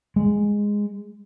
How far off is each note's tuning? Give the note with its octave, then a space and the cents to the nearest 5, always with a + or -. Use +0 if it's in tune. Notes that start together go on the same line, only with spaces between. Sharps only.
G#3 -10